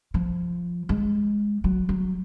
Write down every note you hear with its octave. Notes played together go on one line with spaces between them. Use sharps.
F3
G#3
F#3
F#3